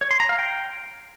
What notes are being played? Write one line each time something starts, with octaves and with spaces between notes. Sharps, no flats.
C#5
C6
A#5
F5
G5